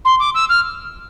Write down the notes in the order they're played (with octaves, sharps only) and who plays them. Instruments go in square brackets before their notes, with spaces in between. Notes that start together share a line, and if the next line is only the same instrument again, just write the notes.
[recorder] C6
D6
E6
F6